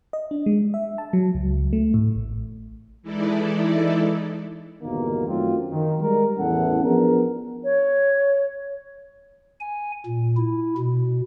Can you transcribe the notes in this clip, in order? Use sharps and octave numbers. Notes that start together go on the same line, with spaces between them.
D#5
D4
G#3
E5
A5
F#3
C#2
A3
A2
A1
E3 G#3 D#4 E4 A4 D5
G1 E2 B2 D#3 A#3
F#2 D#3 F#3 A3 C4 F4
D#3
G3 G#3 A#4
A1 E2 E3 C#4 A4 F#5
F3 B3 D4 G#4 A#4
C#5
G#5
A#2
E4
B2